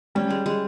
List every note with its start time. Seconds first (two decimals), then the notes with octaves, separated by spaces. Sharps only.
0.15 G3 C#4
0.30 G#3
0.46 G#3